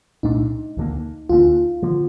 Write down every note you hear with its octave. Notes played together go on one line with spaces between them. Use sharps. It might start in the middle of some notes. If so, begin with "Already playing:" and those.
C2 A#2 A3 D4 D#4
D2 D3 F3 A#3
D2 D3 F3 A#3 F4
D3 F3 A#3